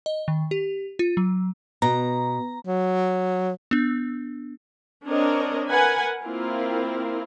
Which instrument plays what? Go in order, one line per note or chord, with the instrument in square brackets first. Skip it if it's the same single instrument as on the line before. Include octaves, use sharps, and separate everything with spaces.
[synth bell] D#5
D#3
G4
F4
F#3
[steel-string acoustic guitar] B2 [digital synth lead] A#5
[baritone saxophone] F#3
[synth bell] B3 D4
[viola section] C4 D4 A#4 C#5 D#5
A#4 B4 F#5 G#5
A#3 C4 E4 F4 A#4